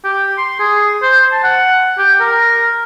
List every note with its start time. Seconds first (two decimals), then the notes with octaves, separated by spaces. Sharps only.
0.05 G4
0.38 C6
0.59 G#4
1.02 C5
1.32 A5
1.44 F#5
1.98 G4
2.20 A#4